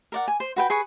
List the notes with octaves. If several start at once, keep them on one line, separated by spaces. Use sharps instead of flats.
A#4 D5 F#5
G#5
C5
F#4 B4 G5
G#4 B4 C#6